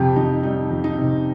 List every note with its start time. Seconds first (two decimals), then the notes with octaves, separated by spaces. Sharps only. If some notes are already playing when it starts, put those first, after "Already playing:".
Already playing: F2 C3 G4
0.16 F2 D#4
0.43 G3 D#4
0.70 F2
0.84 D#4
0.98 C3